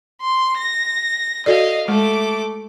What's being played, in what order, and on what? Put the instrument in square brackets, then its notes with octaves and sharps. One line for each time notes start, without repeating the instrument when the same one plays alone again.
[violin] C6
A#6
[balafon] F#4 A4 D5 [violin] D#5 F5
[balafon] G#3 [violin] A3 D6